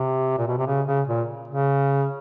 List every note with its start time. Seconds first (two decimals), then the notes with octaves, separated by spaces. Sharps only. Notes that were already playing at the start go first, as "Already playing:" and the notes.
Already playing: C3
0.38 A#2
0.48 B2
0.58 C3
0.67 C#3
0.87 C#3
1.08 A#2
1.48 C#3